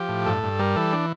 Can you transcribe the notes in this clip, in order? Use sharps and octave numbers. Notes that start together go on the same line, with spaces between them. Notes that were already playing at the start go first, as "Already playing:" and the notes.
Already playing: F3 G4
A2
G2 A4
G2
G3 A#4
E3 A4
D4